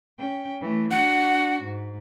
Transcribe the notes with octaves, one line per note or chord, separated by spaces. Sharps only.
C#4 G5
E3 A3
D4 F#4 F#5
G#2